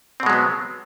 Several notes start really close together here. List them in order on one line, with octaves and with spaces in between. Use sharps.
C4 B2 G#3 F#3 B3